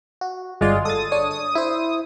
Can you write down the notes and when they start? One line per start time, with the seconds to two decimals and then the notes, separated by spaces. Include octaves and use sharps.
0.21 F#4
0.61 G1 G#3 F4 D5
0.85 A4 D#6 A6
1.12 D4 C#5
1.31 D#6
1.55 E4 C5